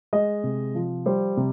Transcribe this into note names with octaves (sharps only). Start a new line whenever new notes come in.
G#3 D#5
C3
F3
G3 C5
C3